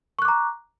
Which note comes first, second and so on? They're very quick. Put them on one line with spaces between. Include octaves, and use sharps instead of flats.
C#6 F#6 D6 A#5